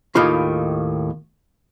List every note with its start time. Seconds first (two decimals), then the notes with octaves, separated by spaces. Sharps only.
0.15 D#2 A2 D#3 F4 B5